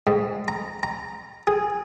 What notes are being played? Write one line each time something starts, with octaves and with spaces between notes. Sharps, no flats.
G#2
A#5
A#5
G#4